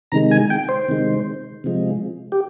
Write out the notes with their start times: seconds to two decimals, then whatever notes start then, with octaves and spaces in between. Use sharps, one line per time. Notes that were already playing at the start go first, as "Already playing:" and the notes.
0.12 C3 D#3 G#3 A#5
0.31 G#5
0.50 G5
0.69 C5
0.88 C3 D#3 G#3
1.64 C3 F3 G#3
2.32 G4